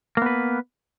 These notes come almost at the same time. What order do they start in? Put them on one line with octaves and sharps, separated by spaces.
A#3 B3 B4